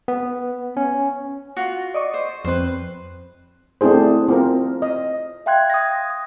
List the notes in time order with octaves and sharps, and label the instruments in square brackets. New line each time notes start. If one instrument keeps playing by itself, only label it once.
[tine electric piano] B3
C#4
[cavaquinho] F4 F#4
[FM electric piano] D5 D#5 C#6
[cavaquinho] C5
[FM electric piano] F2 C4 [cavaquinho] B4 C5
[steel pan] A3 C4 D4 E4 G#4 C5
C4 F4 A#4
D#5
[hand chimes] E5 F5 G5 C6 F#6 G#6
D#6 G#6 A#6
D#6